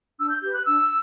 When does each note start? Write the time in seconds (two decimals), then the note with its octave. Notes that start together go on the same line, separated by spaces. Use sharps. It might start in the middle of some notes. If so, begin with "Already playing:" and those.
0.18 D4 E6
0.31 G6
0.42 G4 B4 G6
0.53 F#6
0.66 D4 E6